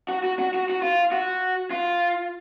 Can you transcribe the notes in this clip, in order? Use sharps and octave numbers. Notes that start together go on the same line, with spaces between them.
F#4
F#4
F#4
F#4
F#4
F4
F#4
F4